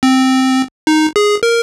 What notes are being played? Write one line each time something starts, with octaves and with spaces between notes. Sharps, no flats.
C4
D#4
G#4
A#4